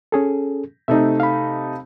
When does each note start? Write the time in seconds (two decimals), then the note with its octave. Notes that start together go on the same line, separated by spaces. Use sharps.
0.12 C#4 G#4 A4
0.88 C3 A3 D#4 E5
1.20 F5 B5